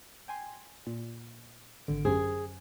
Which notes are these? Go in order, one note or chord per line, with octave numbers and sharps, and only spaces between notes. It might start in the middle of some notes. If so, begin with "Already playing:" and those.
G5 G#5 C6
A#2
G#1 D3 D7
F#2 G4 G#4 C5